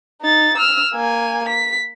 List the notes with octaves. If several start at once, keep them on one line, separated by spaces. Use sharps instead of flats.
D#4 A6
E6 F6
A#3 G#5
B6